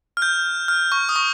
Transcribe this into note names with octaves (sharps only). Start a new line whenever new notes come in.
F6
G6
F6
C#6
D#6
C#6